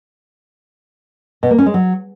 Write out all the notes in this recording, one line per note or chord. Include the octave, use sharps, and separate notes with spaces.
B2
A#3
C#4
G#3
F#3